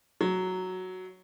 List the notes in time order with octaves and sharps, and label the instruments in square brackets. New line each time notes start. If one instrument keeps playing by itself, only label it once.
[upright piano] F#3